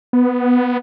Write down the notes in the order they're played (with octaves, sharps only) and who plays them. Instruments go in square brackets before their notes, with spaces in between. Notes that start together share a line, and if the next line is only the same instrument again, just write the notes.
[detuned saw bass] B3